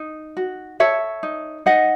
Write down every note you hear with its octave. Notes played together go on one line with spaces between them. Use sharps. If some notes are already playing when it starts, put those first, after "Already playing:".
Already playing: D#4
F#4
A4 C#5 E5
D#4
D#4 D#5 F#5